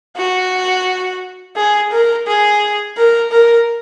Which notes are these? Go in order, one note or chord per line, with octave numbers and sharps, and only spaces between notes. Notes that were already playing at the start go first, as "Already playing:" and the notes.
F#4
G#4
A#4
G#4
A#4
A#4